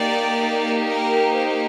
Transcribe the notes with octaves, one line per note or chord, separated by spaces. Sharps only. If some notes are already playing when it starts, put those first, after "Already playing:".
Already playing: A#3 D#4 G4 D5
A#4
C5